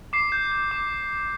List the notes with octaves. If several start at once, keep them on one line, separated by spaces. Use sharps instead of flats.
D6 C7
G6
G6
D6